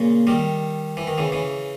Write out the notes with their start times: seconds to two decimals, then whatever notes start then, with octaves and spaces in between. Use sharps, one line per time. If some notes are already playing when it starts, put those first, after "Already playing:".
Already playing: A#2 C#3
0.27 D#3 G3
0.97 E3
1.07 D#3
1.18 C#3 E3
1.32 C#3 E3